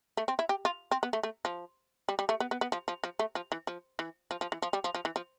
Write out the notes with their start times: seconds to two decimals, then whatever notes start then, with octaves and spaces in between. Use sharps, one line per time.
0.17 A3
0.28 C4
0.39 E4
0.49 G4
0.65 F4
0.91 C4
1.03 B3
1.13 A3
1.23 A3
1.45 F3
2.09 G3
2.19 G3
2.29 A3
2.40 B3
2.51 B3
2.61 B3
2.72 F3
2.88 F3
3.04 F3
3.19 A3
3.35 F3
3.52 E3
3.67 F3
3.99 E3
4.31 F3
4.41 F3
4.52 E3
4.62 F3
4.73 G3
4.84 F3
4.95 F3
5.05 E3
5.16 F3